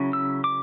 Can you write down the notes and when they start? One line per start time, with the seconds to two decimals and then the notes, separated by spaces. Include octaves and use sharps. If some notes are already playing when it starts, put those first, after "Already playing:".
Already playing: C#3 F#3 C#4 E4
0.13 E6
0.44 D6